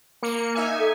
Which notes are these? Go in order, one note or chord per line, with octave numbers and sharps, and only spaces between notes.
A#3 C#7
D#4 E5 G#5
A4